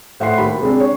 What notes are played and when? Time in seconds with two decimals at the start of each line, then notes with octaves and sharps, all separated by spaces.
0.20 A2 E5 F#5 G5 C6 C7
0.38 D#2 G3 B5
0.60 C3 G#3 C4 D4
0.80 C#5